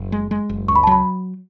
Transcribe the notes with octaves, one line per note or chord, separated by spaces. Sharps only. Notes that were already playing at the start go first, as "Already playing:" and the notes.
Already playing: F#1
G#3
G#3
F#1
C#2 C#6
B5
A5
F#3 B5